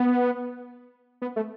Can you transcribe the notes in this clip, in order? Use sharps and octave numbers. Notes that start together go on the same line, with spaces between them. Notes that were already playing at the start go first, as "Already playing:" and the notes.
Already playing: B3
B3
A3